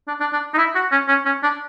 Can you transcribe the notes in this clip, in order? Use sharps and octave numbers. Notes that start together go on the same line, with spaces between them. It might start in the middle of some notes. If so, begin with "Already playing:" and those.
D4
D4
D4
D#4
E4
F#4
C#4
C#4
C#4
D4